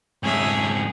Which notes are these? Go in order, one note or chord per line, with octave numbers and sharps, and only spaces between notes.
F2 G#2 G#4 C#5 E5